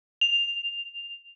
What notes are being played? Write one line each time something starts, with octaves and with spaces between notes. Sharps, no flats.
F7